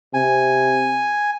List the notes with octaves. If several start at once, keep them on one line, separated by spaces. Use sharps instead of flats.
C3 G#5